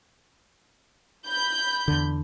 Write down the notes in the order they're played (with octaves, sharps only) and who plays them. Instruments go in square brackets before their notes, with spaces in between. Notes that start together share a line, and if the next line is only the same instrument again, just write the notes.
[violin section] B5 G6
[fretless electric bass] E2 D3